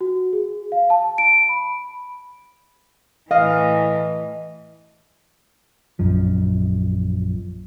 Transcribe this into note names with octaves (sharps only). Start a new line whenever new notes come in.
F#4
G#4
F5
A5
D7
B5
A2 E3 D#5 F5
A#1 F#2 F3